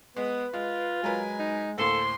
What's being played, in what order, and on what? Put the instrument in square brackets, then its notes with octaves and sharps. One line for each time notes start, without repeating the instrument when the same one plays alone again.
[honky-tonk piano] G#3 [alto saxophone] B3 [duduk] B4
[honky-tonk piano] G#3 [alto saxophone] F4
[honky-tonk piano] F#3 A#4 B4 [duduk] G#3 [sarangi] G#5
[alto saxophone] D#4
[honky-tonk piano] D2 A2 A#3 [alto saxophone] A4 [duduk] C5 [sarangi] C6